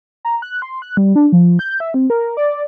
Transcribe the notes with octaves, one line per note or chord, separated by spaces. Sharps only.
A#5
F#6
C6
F#6
G3
D4
F3
G6
E5
C4
A#4
D5